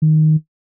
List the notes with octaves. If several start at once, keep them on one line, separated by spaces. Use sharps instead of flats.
D#3